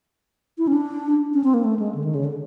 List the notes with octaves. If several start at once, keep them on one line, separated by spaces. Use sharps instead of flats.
E4
C#4
D4
C#4
C4
A#3
A3
G#3
D3
D#3
C#3
D3